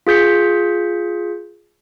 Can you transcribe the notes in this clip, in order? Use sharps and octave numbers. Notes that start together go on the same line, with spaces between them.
F4 G#4 G6 B6 C#7